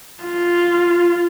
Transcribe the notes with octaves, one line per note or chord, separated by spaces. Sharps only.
F4